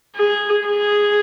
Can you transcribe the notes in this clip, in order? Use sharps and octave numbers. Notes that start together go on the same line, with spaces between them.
G#4
G#4